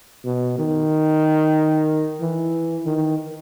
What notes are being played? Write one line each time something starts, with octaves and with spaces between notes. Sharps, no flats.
B2
D#3
E3
D#3